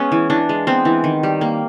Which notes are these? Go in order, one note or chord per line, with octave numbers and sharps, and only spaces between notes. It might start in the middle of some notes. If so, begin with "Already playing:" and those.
Already playing: G#3 B3 C#4
E3
E3 D4
G#3
B3 C4
E3
D#3
G3
A#3